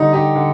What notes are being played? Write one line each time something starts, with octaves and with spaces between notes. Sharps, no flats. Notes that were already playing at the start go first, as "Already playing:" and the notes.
Already playing: D3 G3 D#4
D#4 G4
D3